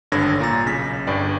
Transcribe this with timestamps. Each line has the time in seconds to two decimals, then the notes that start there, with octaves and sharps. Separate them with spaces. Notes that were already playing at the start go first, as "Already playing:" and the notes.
0.12 G#1 G2 D3 C#5 G#6 A#6
0.40 A#2 A#5 A6
0.66 B1 C#3 A#6 B6
1.07 G1 G2 D5 G5